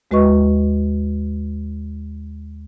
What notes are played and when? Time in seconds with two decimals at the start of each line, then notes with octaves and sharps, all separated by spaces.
0.11 D#2 G#3 F#4 B4 D#5 C#6